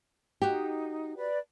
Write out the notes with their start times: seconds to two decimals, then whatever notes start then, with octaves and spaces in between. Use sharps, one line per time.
0.42 D#4 F#4 G4
1.16 B4 D5